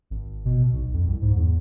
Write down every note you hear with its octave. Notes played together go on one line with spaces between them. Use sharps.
G#1
B2
B1
F2
C2
G#2
E2